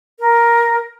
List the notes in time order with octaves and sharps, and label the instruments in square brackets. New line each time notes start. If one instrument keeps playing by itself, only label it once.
[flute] A#4